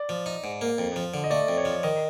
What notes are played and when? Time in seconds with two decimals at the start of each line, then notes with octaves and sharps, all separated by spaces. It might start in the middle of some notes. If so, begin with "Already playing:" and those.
Already playing: D5
0.09 F3
0.26 D#4
0.44 G#2
0.61 A#3
0.78 F2
0.96 F3
1.14 D3
1.24 D#5
1.30 A3 D5
1.48 F2
1.58 C#5
1.65 F3
1.83 D#3 D#5